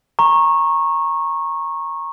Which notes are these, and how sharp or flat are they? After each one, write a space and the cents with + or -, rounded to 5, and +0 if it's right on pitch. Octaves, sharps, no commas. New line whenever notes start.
A#5 +0 C#6 -20